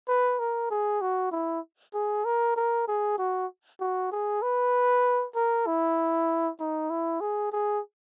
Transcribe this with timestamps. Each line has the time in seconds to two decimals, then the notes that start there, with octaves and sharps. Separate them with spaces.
0.08 B4
0.39 A#4
0.71 G#4
1.02 F#4
1.32 E4
1.94 G#4
2.25 A#4
2.56 A#4
2.88 G#4
3.18 F#4
3.81 F#4
4.12 G#4
4.42 B4
5.36 A#4
5.67 E4
6.60 D#4
6.90 E4
7.21 G#4
7.52 G#4